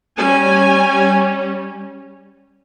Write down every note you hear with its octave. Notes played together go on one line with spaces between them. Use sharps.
G3 C#4 G#5